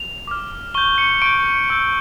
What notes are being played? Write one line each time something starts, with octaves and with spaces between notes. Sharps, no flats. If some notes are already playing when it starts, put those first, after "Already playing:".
Already playing: F7
D6 F6
C#6 G6 G7
C#7
C#6 G6 D7
C#6 E6 G6